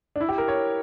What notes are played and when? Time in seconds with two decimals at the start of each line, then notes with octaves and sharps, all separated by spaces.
0.16 D4
0.20 E4
0.29 G4
0.38 A#4
0.48 C#5